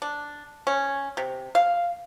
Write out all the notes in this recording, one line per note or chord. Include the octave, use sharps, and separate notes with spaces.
D4
C#4
C3
F5